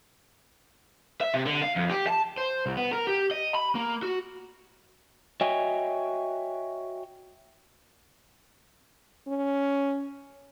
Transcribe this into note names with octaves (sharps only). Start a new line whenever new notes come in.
E5
C3
D3
F5
F2
G4
A5
C5
C2
B3
A#4
G4
D#5
B5
A#3
F#4
F#4 C#5 D#5 E5 G5 G#5
C#4